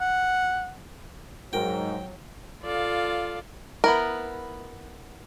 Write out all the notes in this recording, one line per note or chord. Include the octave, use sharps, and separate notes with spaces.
F#5
G#2 F#3 F#4 A#4 G5
F4 A4 D5 F5
B3 E4 A#4